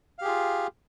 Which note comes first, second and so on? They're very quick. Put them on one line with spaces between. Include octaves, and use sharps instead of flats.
F5 G4 G#4 F4